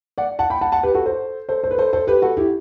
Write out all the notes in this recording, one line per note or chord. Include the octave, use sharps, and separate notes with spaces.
D5 F#5
F#5 A5
G5 B5
F#5 A5
F#5 A5
G4 B4
F#4 A4
A4 C5
A4 C5
A4 C5
B4
A4 C5
A4 C5
G4 B4
F#4 A4
E4 G4